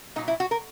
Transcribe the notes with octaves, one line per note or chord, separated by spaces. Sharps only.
A#2 F#3 D#4
E4
F#4
A#4